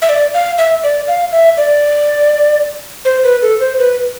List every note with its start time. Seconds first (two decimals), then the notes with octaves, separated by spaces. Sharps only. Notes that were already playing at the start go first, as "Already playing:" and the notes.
0.02 E5
0.09 D5
0.34 F5
0.58 E5
0.83 D5
1.08 F5
1.32 E5
1.57 D5
3.05 C5
3.24 B4
3.42 A4
3.60 C5
3.79 B4